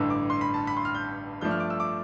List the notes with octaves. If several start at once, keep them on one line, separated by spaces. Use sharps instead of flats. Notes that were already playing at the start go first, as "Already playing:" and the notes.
Already playing: A1 G2 D3 E6
D6
C6
B5
A5
B5
C6
F6
G6
G2 F3 A3 D4 G6
F6
D6
E6
D6